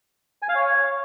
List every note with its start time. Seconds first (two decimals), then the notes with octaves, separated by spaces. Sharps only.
0.42 G#5
0.49 F5
0.55 C#5